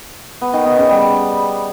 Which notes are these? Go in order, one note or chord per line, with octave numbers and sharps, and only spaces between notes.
B3
D#3
B3
C#3
G3